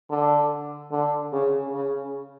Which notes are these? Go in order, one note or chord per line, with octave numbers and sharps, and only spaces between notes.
D3
D3
C#3
C#3